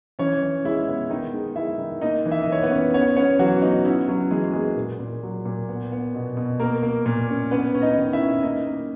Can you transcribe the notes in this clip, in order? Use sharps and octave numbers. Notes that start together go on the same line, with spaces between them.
E3 C#4 C#5
E3
G#3 E4 E5
B3
D#3 D#4 D#5
G#3
G#3 E4 E5
D#3
A#3 D#4 D#5
E3
E5
D#5
E3
C#5
B3 B4
C#4
B3 C#4 C#5
B3 C#4 C#5
E3 F#3 F#4
B3 D#4
C#4 E4
F#3 C#4 F#4
E3 G#3 G#4
G#3 A#3 G#4
A#2
A#2
F#3
A#2
B3
B3
B2
B2
A#3 A#4
A#3
A#2
C#4
B3 C#4 B4
C#4
D#4 D#5
D#3
E4 E5
C#4
A#3 D#4 D#5
A#3